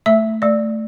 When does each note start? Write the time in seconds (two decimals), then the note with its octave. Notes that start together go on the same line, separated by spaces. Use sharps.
0.06 A3 E5
0.42 A3 D5